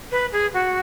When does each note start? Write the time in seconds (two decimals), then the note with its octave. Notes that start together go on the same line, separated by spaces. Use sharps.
0.11 B4
0.32 G#4
0.53 F#4